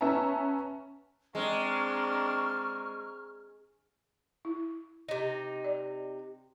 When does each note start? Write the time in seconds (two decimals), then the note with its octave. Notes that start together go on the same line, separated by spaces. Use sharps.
0.01 B3 C#4 B4 E5 A5 A#5
1.35 G#3 C4 D4 A#5 C#6 F6
4.45 E4
5.08 C3 D#4
5.64 D5